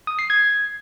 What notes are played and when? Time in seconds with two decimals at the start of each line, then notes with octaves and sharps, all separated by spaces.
0.07 D#6
0.19 C7
0.30 G#6